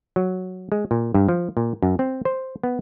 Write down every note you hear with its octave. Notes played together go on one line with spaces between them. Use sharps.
F#3
G#3
A#2
G2
F3
A#2
F#2
C4
C5
B3